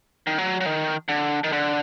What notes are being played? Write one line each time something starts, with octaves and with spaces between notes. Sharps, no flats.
D#3
F#3
F#3
D#3
D3
D#3
D3